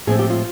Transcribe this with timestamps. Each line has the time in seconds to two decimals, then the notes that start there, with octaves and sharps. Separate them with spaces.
0.07 A2 F3 G#3 C4 G#4
0.19 G4
0.30 F4